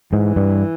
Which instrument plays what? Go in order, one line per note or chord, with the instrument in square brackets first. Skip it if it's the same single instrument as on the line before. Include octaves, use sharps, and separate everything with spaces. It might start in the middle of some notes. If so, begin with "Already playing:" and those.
[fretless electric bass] G#2 [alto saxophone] E3
[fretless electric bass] G2